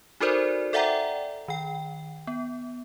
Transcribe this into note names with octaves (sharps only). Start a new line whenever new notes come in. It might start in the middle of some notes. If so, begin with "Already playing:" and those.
D#4 F#4 A4 A#4 C5 D5
A4 D5 E5 F#5 G5 A#5
D#3 G5
B3